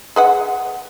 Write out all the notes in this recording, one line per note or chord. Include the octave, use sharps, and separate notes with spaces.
G#4 B4 F#5